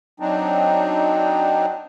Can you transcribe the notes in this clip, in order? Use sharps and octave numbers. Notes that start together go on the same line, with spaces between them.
F#3 C4 D4 D#4